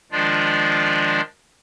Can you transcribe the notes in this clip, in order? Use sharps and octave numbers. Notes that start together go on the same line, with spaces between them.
D#3 F3 G#3 D4 F4 D5